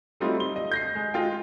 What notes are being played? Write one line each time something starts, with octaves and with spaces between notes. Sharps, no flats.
F#3 G3 A3 C4 D#4 F4
G7
D#5
G6 A#6 C7
G#3
G#3 F4 G5